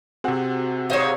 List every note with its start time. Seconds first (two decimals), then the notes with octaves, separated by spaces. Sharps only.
0.24 C3 C4 F#4 G#4 F#5
0.90 G#2 C5 C#5 D#5 F5